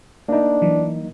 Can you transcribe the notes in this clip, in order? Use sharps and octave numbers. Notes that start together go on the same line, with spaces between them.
A#3 D4 D#4
E3 F#3